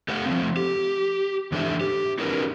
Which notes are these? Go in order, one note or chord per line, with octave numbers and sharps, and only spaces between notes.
A3 G4 A4 C5 F5 F#5
F3 G3 A3 C4
G4
G#2 E3 D4 A4 C5 E5
G4
C#4 D#4 F#4 G#4 A#4 B4